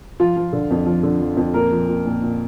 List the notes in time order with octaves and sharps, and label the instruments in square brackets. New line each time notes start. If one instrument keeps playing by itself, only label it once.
[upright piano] F3 F4
F3
D3
F2
F3
D3
F3
F2
A#2 A#4
F3
A#2
A#2
A#2